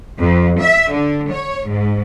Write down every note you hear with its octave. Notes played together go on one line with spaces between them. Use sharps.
F2
E5
D3
C#5
G#2